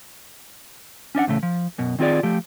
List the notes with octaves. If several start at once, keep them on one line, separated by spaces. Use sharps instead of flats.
C#4 D4 D#5 F#5
E2 A2 C#3 A3
F3
F#2 B2
D#3 C4 F4 G#4 D5
F3 A3 G4